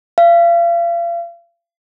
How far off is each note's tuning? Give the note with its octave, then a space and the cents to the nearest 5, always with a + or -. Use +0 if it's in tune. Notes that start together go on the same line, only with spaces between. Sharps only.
F5 -40